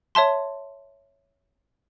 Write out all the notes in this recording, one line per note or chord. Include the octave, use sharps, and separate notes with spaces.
C#5 E5 A5 C6